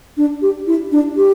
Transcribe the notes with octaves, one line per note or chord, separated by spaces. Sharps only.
D4
G4
E4
D4
G4